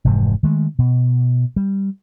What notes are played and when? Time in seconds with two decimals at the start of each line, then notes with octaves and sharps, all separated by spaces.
0.05 F1 G#2 C3 E3
0.43 D#3 G#3 A3
0.79 B2
1.56 G3